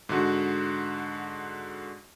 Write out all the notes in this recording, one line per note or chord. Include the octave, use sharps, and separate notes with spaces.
G#2 D3 F#4